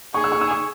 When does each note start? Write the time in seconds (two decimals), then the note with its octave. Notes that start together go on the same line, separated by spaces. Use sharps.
0.14 G#4 C#6
0.24 E6
0.32 C#6
0.41 E6
0.51 C#6